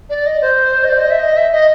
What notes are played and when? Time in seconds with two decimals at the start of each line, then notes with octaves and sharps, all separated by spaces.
0.09 D5
0.26 D#5
0.41 C5
0.84 D#5
0.89 D5
0.99 D#5
1.10 E5
1.20 D#5
1.37 E5
1.52 D#5